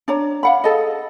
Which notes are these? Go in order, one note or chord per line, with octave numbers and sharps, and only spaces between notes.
D4 C#5 A#5
F5 F#5 B5
G#4 A4 D#5